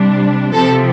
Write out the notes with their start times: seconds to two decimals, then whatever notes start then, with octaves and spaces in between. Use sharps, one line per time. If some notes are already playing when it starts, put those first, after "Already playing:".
Already playing: C3 G3 D4
0.53 C3 F3 C4 A4